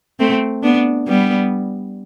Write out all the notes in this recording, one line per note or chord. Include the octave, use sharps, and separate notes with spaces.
A3 C4
B3 D4
G3 B3